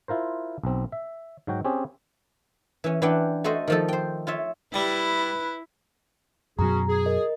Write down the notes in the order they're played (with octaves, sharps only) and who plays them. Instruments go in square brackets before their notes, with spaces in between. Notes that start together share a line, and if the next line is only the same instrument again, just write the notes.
[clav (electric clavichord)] E4 F4 A#4 C5
B1 C4
E5
G#2 F#3 F#4 G5
C4 C#4 G4 G#4
[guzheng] E3 C#4
E3 D4 B4 F#5 G5
A3 F#4 A4 C5 D#5
D#3 F3 A4
C5 G5
F4 C#5 E5
[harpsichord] G3 [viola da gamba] E4 [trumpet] B4
[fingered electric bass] F#2 B2 F#3 [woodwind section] C#4 F#4 G#4 [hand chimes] A#5
[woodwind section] G#4
[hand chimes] A#4 D#5